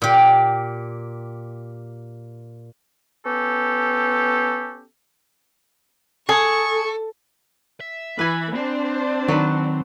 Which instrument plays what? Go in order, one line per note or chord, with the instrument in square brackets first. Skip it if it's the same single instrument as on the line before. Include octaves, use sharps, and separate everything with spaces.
[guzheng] A#2 G4
[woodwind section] B3 C#4 G4 A4
[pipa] G#4 [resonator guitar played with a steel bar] A4 [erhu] C#6
[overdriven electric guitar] E5
[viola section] E3 B5 [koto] B4 G#5
[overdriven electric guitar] C4 [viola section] D4 C5
[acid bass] D#3 [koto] F#3 B4